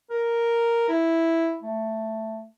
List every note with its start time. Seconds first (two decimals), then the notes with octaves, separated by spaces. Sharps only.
0.10 A#4
0.89 E4
1.63 A3